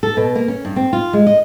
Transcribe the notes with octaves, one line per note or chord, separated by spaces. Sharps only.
A4
B2
A#3
C#4
G2
C4
F4
G#3
D#5